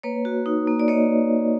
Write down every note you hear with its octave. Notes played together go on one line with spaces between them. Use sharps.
A#3 B4 C#5
F#4
D#4
A#3
D5
A#3 C#5 D#5